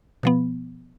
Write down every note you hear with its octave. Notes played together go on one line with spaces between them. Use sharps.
B2 F3 B3